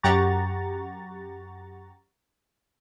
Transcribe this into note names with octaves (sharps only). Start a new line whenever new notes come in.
F#2 G4 F#5 A#5 C#6 A6